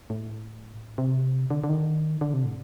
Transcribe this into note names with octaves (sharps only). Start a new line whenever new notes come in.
A2
C3
D3
D3
D#3
D3
C3
A2